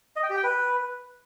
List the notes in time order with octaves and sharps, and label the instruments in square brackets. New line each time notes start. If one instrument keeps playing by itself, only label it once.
[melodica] D#5
G5
G4
G5
B4